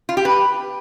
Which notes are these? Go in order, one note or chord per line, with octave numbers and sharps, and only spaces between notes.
F4
G4
B4